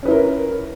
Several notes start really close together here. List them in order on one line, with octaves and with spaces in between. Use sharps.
C#4 B4 E4 A#4